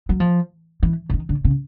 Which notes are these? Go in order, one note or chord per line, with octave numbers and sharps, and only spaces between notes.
F#3
F3
E3
D3
D#3
D3
C#3